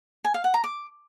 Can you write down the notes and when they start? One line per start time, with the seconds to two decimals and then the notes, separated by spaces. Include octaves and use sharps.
0.25 G#5
0.34 F5
0.44 F#5
0.54 A#5
0.64 D6